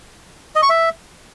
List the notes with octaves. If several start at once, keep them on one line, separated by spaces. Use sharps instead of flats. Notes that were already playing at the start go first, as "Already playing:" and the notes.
D#5
C#6
E5